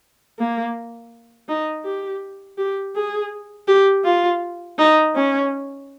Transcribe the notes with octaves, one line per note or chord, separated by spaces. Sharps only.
A#3
D#4
G4
G4
G#4
G4
F4
D#4
C#4